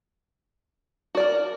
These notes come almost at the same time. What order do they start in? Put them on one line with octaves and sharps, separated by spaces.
F#4 D5 A#4